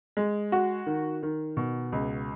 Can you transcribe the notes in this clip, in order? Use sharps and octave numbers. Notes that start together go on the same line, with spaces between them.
G#3
F#4
D#3
D#3
B2
C#2